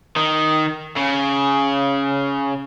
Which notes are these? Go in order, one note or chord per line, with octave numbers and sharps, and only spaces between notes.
D#3
C#3